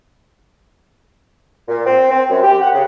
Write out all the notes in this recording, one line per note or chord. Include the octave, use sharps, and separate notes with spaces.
A#2
C4
C4
F#2
G4
F#5
C#3